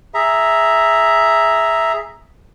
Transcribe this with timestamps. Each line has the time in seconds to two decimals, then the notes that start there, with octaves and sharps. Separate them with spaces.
0.14 G#4 E5 A#5